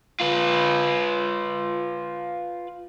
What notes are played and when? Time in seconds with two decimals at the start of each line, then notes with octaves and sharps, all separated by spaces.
0.21 F4 B4